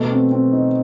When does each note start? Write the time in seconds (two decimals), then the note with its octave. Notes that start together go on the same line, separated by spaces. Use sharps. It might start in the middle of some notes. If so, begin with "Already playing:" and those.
Already playing: B2 A3
0.11 C4
0.32 C4
0.53 D#4